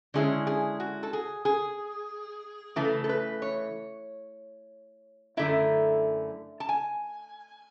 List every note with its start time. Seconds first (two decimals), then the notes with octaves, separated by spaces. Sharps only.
0.14 D3 G#3 C#4 E4 G#4
0.47 G#4
0.80 F#4
1.03 A4
1.13 G#4
1.45 G#4
2.76 C#3 E3 A3 A4
3.04 A4
3.09 B4
3.42 C#5
5.37 F#2 D3 A3 E4 E5
6.60 A5
6.69 G#5